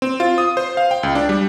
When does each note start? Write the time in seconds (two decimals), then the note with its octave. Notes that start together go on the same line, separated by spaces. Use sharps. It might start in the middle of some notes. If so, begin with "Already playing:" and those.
0.02 C4
0.20 F4
0.38 D#6
0.57 C5
0.77 F5
0.91 G5
1.03 C#2
1.15 D4
1.29 G3